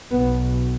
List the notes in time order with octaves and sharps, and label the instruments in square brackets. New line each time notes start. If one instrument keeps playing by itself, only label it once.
[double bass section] B1 B2 B3